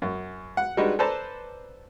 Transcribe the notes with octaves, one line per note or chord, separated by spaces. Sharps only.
F#2
F#5
G3 G#3 D4 D#4 F#4 B4
A4 B4 C5 D5 A5 A#5